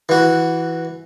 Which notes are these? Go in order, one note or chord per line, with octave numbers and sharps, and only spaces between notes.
E3 F#4